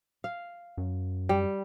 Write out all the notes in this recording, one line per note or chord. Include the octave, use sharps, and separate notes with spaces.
F5
F#2
G3